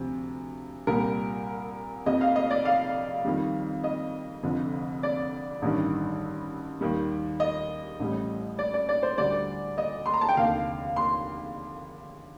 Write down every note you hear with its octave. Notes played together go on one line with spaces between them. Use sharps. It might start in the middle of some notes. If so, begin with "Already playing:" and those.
Already playing: D2 C3 F3
C2 A#2 G3 A#4
F1 F2 C3 D#5
F5
D#5
D5
F5
F2 D#3 G3
D#5
F1 F2 D3 F3
D5
A1 G2 D#3 G3
D#2 D#3 G3
D#5
A1 A2 G3
D5
D5
D5
C5
D2 D3 G3 D5
D#5
C6
A#5
A5
G5
F1 D#2 D3 F5
C6